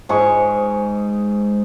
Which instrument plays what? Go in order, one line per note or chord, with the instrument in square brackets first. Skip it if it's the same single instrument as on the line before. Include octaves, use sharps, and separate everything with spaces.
[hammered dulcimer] G#2 G#3 G#5 C#6